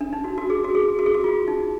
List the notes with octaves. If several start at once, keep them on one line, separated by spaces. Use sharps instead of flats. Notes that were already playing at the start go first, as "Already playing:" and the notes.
D4
D#4
F#4
F#4
G#4
F#4
G#4
F#4
G#4
F#4
F4
D#4